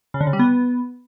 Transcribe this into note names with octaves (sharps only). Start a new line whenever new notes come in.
C#3
D3
C#3
G3
B3